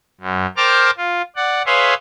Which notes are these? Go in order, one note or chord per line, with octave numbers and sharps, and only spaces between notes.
F#2
A#4 C5 G5 A5 D6 F6
F4
D5 F#5
G#4 B4 C#5 E5 F5 C6